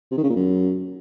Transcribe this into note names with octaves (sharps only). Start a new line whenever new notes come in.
C3
D#3
C#3
A#2
F#2